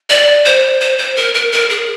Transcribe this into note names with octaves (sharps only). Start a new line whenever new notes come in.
D5
C5
C5
C5
A#4
A#4
A#4
G#4